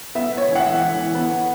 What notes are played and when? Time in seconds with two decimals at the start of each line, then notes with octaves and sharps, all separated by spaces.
0.15 B3 E5
0.37 C#5
0.48 E3
0.55 F#5
0.60 E5
0.82 E3
1.15 B3